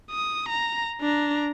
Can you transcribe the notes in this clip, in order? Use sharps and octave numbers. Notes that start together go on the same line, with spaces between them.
D#6
A#5
D4 A#5